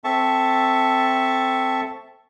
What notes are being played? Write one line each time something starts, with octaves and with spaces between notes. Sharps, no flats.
C4 A4 E5 A5 C#6